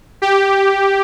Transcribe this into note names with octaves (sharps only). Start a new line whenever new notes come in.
G4